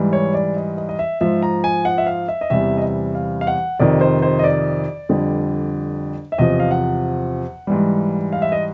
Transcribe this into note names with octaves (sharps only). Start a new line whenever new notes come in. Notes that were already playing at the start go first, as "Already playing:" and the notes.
Already playing: G#2 E3 G3
C#5
D5
D#5
D#5
D#5
E5
G#2 F3 E5
A#5
G#5
F#5
E5
F5
E5
D#5
E2 C3 E3 G3 E5
D#5
E5
F5
F5
F#5
F2 C3 D#3 D5
C5
C5
D#5
D5
F2 D3 G3
E5
E2 C3 F3 D#5
F5
F#5
G#2 E3 G3
F5
E5
D#5